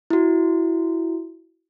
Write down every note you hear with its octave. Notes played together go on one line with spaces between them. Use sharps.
E4 F#4